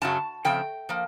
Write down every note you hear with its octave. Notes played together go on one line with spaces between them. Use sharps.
F#2 C#3 F#3 A5
C#3 F3 A3 C4 G5
F3 A#3